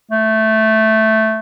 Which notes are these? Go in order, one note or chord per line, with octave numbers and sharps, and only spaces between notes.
A3